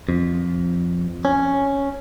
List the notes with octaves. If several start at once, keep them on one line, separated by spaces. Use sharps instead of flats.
F2
C#4